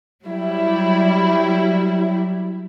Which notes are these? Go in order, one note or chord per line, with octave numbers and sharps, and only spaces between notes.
F#3 G3 E4